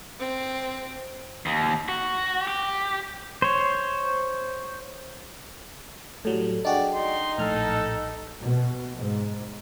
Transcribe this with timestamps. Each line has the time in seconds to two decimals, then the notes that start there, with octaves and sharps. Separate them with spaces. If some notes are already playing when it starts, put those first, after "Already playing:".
0.18 C4
1.46 D#2
1.89 F#4
2.47 G4
3.42 C5 C#5
6.25 A2 F#3 G3 A4
6.65 D4 F#4 G#4 D5 D#5 G5
6.95 D#4 C6
7.38 A#1 A2 A4 F6
8.41 B2
8.97 G#2